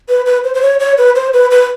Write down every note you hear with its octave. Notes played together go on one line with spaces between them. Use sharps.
B4
B4
C5
C5
C#5
C#5
B4
C5
B4
B4